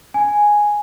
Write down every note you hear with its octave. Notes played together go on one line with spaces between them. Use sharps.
G#5